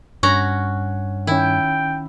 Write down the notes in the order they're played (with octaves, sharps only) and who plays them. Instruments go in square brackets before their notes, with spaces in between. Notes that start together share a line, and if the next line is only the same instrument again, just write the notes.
[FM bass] G2 [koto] C#4 F#4 A#5
[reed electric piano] D#3 C#4 [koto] E4 [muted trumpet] G5